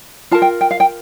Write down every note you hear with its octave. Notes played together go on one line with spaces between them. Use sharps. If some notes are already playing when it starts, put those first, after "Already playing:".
F4 A#4 A5
G5
G5
F5
G5